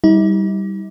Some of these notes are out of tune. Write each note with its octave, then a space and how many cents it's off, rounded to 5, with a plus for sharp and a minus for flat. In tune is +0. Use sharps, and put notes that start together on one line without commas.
G3 -5 D#4 +45